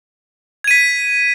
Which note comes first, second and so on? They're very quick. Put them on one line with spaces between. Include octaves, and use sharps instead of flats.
G#6 D#7 B6